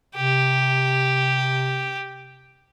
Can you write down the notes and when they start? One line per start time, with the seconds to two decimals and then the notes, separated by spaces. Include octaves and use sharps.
0.16 C3 G4